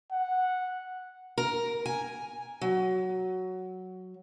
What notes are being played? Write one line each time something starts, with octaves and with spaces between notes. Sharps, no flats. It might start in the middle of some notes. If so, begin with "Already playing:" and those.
F#5
A#4
G#5
F#3